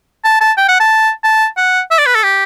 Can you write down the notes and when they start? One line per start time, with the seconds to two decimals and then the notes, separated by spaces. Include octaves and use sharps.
0.24 A5
0.41 A5
0.57 G5
0.68 F#5
0.80 A5
1.24 A5
1.57 F#5
1.91 E5
1.99 D5
2.06 B4
2.15 A4
2.23 G4